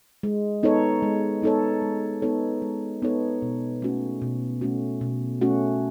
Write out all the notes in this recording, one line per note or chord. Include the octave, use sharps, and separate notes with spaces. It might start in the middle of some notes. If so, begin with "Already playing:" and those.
G#3
B3 D#4 A4 C#5
G#3
B3 D#4 A4 C#5
G#3
B3 D#4 A4 C#5
G#3
B3 D#4 A4 C#5
B2
A3 C#4 F#4
B2
A3 C#4 F#4
B2
A3 C#4 F#4